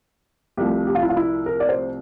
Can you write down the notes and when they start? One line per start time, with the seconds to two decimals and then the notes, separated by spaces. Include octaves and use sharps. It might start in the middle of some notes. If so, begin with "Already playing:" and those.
0.57 C2 C3 F3 A3 G4
0.87 G4
0.95 F4
1.03 E4
1.09 F4
1.17 E4
1.46 A#4
1.60 D5
1.69 C5